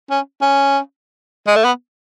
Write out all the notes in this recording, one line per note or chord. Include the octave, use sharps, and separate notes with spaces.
C#4
C#4
G#3
A3
B3